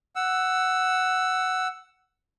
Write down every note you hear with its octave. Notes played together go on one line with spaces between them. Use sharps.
F#5 E6